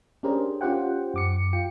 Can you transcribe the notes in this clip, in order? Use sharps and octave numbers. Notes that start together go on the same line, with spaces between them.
C#4 D4 G4 G#4 A#4 C5
C#4 F4 G4 C5 F#5 G5
F#2 D6 C#7
F4 G5 C#7